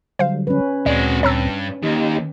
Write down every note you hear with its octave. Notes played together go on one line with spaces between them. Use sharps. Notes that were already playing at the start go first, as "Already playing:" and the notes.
D3 F#3 G3 C5 F5
C#4 B4
D2 A#2 G#3 C4 F#4 D5
G2 C#5 A#5 E6
D#2 D#4 G4 D#5